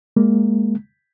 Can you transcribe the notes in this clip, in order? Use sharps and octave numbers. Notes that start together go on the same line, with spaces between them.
G#3 A#3